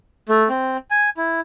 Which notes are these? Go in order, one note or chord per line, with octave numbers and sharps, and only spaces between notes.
A3
C4
G#5
E4